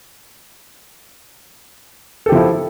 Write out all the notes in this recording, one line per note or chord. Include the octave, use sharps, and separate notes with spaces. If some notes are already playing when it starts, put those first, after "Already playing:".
F3 E4 G4 A4